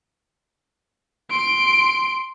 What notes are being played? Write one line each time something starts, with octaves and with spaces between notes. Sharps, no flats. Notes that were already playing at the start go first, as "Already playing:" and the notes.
C6 D7